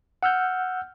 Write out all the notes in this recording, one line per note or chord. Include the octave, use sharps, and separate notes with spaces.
F#5 E6 F6 G6